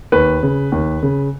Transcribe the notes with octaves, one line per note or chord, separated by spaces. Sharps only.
D#2 B4
C#3
D#2
C#3